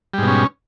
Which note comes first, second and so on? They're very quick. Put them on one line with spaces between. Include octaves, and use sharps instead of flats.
G3 G#2 B2 C#4